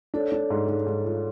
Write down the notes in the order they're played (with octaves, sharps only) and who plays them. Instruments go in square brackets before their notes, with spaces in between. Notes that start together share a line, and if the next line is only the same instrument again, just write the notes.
[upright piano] D4 [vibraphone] A4 C#5
[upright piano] D4
G#2
G#2
G#2
F4